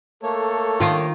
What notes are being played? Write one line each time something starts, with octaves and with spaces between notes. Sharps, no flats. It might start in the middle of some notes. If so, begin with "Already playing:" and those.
A3 A#3 A4 C#5
D#3 F4